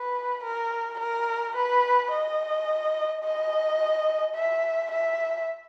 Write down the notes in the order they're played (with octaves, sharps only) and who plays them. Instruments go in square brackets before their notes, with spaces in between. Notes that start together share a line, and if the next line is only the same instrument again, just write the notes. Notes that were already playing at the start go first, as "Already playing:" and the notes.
Already playing: [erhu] B4
A#4
A#4
B4
D#5
D#5
E5
E5